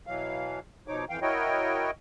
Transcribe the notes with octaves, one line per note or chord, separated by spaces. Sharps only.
B2 E3 F#3 F5
B2 F3 D#4 C#5 D6
F2 E3 F5 G5
E4 F#4 A#4 C#5 D#5 G5